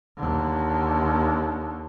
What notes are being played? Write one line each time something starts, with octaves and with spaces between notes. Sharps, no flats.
D#2 D3